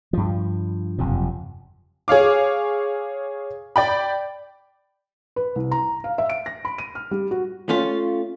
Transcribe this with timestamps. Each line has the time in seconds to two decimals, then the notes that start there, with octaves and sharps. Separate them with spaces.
0.13 G2 F3
0.98 F#1 F2 C3 F3
2.08 G#4 C#5 F5 D6
3.76 D5 G5 B5
5.36 B4
5.56 C2
5.71 A#5
6.04 F5
6.18 E5
6.30 D7
6.46 A#6
6.65 B5
6.78 D#7
6.95 F6
7.11 G3
7.31 F#4
7.69 A3 C#4 F4